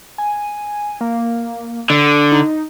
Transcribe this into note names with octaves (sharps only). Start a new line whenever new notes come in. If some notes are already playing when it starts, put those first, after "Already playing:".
G#5
A#3
D3
D#4